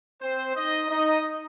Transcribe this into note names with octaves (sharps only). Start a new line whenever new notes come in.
C4 C5
D#4 D#5
D#4 D#5